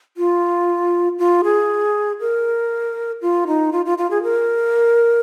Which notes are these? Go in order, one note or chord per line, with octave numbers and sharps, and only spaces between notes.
F4
F4
G#4
A#4
F4
D#4
F4
F4
F4
G#4
A#4